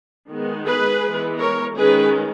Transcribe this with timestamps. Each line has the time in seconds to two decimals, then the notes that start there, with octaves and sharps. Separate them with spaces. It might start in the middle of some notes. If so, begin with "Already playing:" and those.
0.30 D#3 G#3 B3
0.67 G#4 B4
1.03 E3 G#3 B3
1.40 A#4 C#5
1.77 D#3 G#3 C#4 G#4 B4